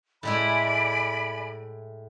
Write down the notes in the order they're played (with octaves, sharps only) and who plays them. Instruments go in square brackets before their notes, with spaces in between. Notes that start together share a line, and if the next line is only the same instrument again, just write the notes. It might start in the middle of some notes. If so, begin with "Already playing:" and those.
[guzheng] A2 G#3 E4 [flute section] D5 G#5 B5